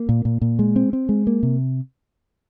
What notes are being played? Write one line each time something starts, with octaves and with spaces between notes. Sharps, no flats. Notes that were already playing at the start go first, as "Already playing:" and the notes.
Already playing: A#3
A#2
A#2
A#2
G#3
C4
C4
G#3
A#3
C3